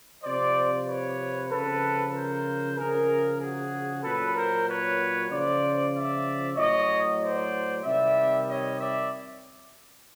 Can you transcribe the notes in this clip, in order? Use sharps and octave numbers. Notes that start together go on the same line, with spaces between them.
C3 F3 C5 D5
B4 C#5
C#3 F3 A4 B4
A#4 C5
C#3 F3 G#4 A#4
F#4 G#4
A#2 F#3 A4 B4
A#4 C5
B4 C#5
C#3 F3 C5 D5
D5 E5
A2 F#3 C#5 D#5
C5 D5
C3 D#3 G3 D5 E5
C#5 D#5
D5 E5